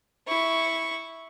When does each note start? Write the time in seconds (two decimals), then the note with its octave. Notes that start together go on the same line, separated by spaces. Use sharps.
0.27 E4 C#6